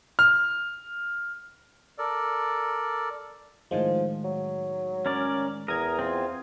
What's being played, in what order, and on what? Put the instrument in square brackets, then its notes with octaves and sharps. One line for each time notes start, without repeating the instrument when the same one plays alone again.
[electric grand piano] F6
[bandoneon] A4 A#4 D5
[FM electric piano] A2 D#3 G#3 [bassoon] F3
[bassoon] F#3
[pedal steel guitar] C#4 A#4 D5
[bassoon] E2 [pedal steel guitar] A#4 [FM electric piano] D#6 G#6
[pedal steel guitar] C4 F4